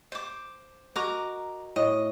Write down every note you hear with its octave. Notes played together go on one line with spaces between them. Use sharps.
C5 D6
F#4 A#4 D#5 A#5 D6
A2 D#5